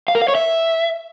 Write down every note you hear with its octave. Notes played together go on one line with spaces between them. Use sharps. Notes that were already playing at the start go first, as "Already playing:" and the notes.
F5
A#4
F5
C#5
E5